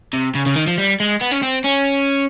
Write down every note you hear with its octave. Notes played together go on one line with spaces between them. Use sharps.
C3
C#3
C#3
D#3
F3
G3
G#3
B3
C#4
C4
C#4